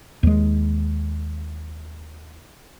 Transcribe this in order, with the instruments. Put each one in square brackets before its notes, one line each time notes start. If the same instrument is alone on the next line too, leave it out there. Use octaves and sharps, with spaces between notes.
[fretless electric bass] D#2 G#3